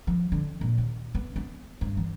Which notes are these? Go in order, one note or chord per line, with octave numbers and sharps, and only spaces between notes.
F3
D3
A#2
D#2
B3
B3
G2
E3